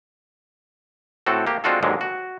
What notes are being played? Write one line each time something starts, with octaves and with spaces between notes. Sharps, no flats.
A2 C4 F#4 A4
A#3 G4
G#3 C4 D4 F4 F#4 A4
D#2 G#2 D3 F#3 G#3
F#4